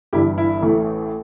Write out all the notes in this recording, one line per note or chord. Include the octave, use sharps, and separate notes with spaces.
G1 G2 E3 E4 G4
E4
A1 A2 E3 A3